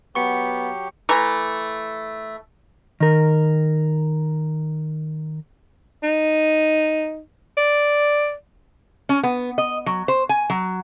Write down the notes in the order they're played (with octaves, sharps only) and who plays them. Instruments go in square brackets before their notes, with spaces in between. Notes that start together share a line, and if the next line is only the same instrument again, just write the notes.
[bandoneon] F#3 G4 [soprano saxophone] B3 [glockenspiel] C#6 C#7
[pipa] E3 A3 A#5
[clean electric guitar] D#3 A#4
[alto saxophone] D#4
D5
[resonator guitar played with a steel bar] C#4
B3
D#5
F#3
C5
G#5
F#3